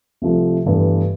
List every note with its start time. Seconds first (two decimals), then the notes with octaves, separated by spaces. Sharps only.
0.22 C2 C3 F3 A3
0.65 G1 G2 E3 A3